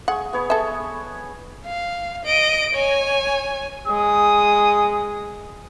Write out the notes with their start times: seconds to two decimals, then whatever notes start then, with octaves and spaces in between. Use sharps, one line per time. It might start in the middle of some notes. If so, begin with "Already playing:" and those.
0.08 G#4 F#5 C#6
0.33 B3 C#5 B5
0.50 A4 E5
1.65 F5
2.25 D#5 D7
2.75 C#5 G#5
3.87 G#3 D#6